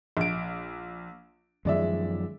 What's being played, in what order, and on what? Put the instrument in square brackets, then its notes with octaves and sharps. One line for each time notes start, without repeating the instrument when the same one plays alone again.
[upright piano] A#1 D7
[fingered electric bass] F#2 D#3 F3 [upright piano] G#3 D5 E5